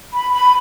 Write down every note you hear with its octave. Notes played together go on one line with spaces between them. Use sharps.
B5
B5